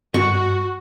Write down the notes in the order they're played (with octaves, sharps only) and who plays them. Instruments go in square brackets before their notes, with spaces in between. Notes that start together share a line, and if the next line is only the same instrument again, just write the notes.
[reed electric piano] G2 [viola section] F#4 [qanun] C#6